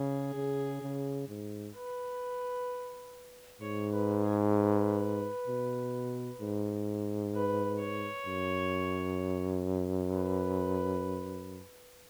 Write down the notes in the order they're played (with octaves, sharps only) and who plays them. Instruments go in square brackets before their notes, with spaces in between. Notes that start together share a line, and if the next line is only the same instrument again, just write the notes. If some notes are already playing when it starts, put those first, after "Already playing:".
Already playing: [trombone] C#3 [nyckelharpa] G#4
[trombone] C#3
C#3
G#2
[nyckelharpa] B4
[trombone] G#2 [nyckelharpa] C#5
[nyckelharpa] B4
G#4
B4
[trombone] B2
G#2
[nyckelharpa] B4
C#5
[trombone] F#2
[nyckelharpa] B4